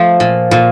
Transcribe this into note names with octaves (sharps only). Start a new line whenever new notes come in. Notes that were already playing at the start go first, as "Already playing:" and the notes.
Already playing: F3 A3
A#2
A#2